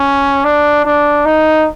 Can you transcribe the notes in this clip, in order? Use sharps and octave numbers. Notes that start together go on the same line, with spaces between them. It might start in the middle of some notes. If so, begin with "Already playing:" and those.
Already playing: C#4
D4
D4
D#4